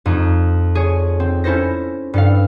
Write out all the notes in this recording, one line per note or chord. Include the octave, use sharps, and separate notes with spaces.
F2 D#4
G#4 C#5
C4
C#4 E4 A4 C5 A#6
G2 A4 F5